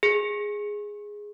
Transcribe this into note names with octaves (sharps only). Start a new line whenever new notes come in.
G#4